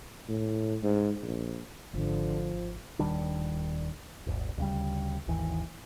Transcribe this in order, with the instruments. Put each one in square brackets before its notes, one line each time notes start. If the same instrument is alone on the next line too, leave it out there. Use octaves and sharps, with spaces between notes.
[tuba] A2
G#2
A#1
[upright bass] G#1 [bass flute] D3 [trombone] F3
[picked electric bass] D#1 D#3 G3 D4
D#1 G#1
D2 C#3 G3
G#1 D#2 E3